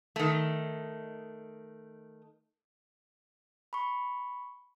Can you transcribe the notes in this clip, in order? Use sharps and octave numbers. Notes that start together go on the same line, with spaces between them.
D#3 A3
B5 C#6